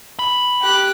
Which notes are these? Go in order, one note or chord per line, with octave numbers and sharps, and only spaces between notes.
B5
G4 F#6